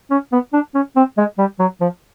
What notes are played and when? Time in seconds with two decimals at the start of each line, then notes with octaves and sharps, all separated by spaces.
0.11 C#4
0.32 B3
0.53 D4
0.75 C#4
0.96 C4
1.17 G#3
1.38 G3
1.59 F#3
1.81 F3